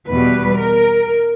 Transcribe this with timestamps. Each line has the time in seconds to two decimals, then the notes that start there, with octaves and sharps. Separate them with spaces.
0.10 E2 B2 G3 B4
0.61 A#4